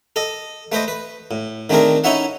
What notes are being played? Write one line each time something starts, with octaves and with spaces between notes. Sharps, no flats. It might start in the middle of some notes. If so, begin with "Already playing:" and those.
A4 D#5
A3 B4 C5 D#5
B4
A2
D#3 A3 C4 D4 G#4 A#4
C#4 D#4 E4 C#5 E5 F#5